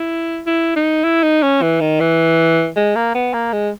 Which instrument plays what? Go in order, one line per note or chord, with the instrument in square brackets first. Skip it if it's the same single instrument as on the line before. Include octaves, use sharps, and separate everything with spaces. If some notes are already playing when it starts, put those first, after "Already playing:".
Already playing: [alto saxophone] E4
E4
D#4
E4
D#4
C#4
E3
D#3
E3
G#3
A#3
B3
A#3
G#3